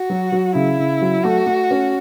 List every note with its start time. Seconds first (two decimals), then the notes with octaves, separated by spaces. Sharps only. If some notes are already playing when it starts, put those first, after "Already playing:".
Already playing: F#4
0.10 F#3
0.32 F#3
0.55 C#3 E4
0.79 C#3
1.01 F#3
1.24 A3 F#4
1.47 A3
1.71 C#4